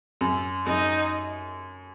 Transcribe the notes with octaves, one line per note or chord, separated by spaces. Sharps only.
F#2
F#2 D#4